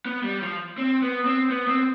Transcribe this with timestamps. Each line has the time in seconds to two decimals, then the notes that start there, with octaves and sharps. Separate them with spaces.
0.05 B3
0.24 G3
0.42 F3
0.78 C4
1.02 B3
1.26 C4
1.50 B3
1.68 C4